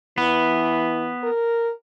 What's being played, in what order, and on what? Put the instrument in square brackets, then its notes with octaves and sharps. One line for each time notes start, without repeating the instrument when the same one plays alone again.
[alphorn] E3 [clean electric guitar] B3
[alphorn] A#4